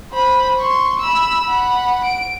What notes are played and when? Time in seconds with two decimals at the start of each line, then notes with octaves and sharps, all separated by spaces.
0.12 C5 B5
0.59 C6 C#6
1.00 B5 E6
1.45 F#5 B5
2.05 D7